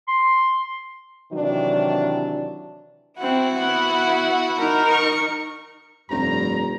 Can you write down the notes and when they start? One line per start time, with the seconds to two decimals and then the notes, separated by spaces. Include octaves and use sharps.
0.08 C6
1.32 C3 D#3 E3 F#3 D4
3.18 C4 E4 F#4 F#5
3.56 B3 F#5
4.59 D#4 A#4
4.90 C#6
6.11 F1 G2 A#5